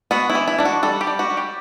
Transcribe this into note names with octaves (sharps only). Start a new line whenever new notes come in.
B3 F#4
E4
E3
E4
D4 E4
F#4
G3 A4
G4
G3
F#4
G3
G4